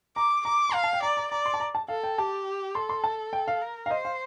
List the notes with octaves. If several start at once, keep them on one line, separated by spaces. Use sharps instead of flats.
A#5 D6
A#5 D6
C6
F5 A#5
A5
G5
D5 A#5
A#5
D5 A#5
C6
A5
A#5
A5
A4 F5
G5
G4 A5
A4 C6
C6
A5
G5
F5
A#4
F5
C5 D#5
F5